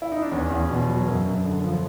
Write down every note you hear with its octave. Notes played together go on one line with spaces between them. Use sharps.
E4
D#4
D4
E2 C#4
E2
B2
F#3
F#2
F#2
D3
F3